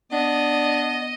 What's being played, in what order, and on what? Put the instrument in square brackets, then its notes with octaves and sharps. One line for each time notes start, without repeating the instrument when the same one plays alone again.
[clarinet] B3 [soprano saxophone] D4 [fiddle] D#5